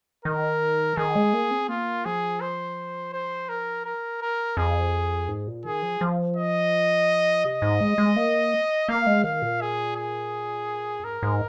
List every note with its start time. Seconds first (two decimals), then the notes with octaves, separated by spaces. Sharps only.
0.25 D#3 A#4
0.97 D#3 G#4
1.15 G#3
1.33 A#3
1.51 C4
1.69 A#3 F4
2.05 F3 G#4
2.41 C5
3.13 C5
3.49 A#4
3.85 A#4
4.21 A#4
4.57 F2 G#4
5.28 G#2
5.47 A#2
5.65 D#3 G#4
5.82 F3
6.01 F3
6.37 D#5
7.45 C3 D#5
7.62 G#2
7.81 G#3
7.98 G#3
8.16 A#3
8.89 A#3 F5
9.06 G#3
9.24 D#3 F5
9.42 A#2
9.61 G#4
9.96 G#4
10.99 F2
11.04 G#2 A#4
11.23 G#2